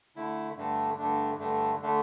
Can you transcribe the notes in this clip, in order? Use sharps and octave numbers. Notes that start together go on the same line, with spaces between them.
D3 A3 E4
G2 D3 A3 D4
G2 D3 A3 D4
G2 D3 A3 D4
D3 A3 D4